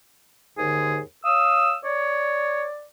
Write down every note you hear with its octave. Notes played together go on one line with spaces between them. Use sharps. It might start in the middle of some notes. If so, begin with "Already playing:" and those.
D#2 G#2 D3 G#4
C#5 F5 D#6 E6
C#5 D5